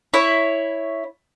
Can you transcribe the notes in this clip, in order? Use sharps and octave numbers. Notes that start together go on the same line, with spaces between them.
E4 C#5